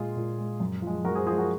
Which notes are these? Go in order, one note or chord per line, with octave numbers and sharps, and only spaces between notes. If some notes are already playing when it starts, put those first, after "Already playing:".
Already playing: A#2 G#3 F4 G#4
A#2
G#3
F#2
F3 G#3
F#2 F#4 A#4
G#4 C5
F3 G#3 G#4 C5
F#4 A#4